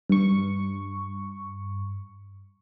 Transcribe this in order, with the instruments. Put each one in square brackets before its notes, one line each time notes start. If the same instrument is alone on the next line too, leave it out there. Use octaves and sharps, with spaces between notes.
[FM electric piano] G2 C#6